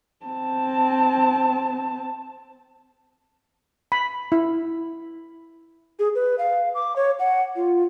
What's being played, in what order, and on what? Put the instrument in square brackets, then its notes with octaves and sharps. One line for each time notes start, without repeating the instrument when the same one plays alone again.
[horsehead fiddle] C4 A5
[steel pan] B5
E4
[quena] G#4
B4
F5
D6
C#5
F#5
F4